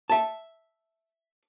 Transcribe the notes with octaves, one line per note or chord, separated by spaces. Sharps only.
E5 A5